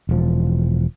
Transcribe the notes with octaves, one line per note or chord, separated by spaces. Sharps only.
E1 F3